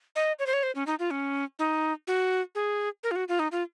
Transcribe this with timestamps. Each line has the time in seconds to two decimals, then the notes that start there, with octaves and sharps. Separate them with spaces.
0.16 D#5
0.39 C#5
0.46 C5
0.53 C#5
0.63 C5
0.75 C#4
0.87 D#4
0.99 F4
1.11 C#4
1.59 D#4
2.07 F#4
2.55 G#4
3.03 A#4
3.11 F4
3.16 F#4
3.29 F4
3.39 D#4
3.52 F4